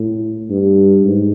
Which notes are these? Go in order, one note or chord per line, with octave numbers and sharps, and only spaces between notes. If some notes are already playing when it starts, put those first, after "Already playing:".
Already playing: A2
G2
G#2